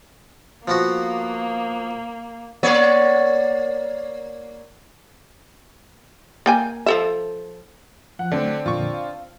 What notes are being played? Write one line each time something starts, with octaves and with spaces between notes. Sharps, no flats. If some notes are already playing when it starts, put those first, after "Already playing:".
F3 A#3 B3 F#4
A#3 C#5 D5
A#3 G5 G#5
F3 A4 E5
F3 F#5 F#6
D3 F#3 A3 C4 D4
F2 A#2 D3 F4 C#6
F5